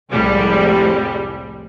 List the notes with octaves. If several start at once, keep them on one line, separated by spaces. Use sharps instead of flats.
C2 F2 A2 G3 G#3